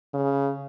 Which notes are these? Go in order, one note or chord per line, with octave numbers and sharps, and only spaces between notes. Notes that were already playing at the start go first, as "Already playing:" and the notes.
C#3